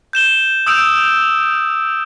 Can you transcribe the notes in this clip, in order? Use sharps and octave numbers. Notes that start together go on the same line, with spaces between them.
G6 E7 G7
D#6 E6 G6 D7 F7